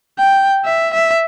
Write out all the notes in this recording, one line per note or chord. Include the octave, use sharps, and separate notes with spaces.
G5
E5
E5